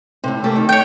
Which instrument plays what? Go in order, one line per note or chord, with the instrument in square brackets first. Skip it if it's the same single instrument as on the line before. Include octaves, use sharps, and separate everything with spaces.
[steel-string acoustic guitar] A2 C3
A3 A#3 G4
D#3
[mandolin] C#5 G5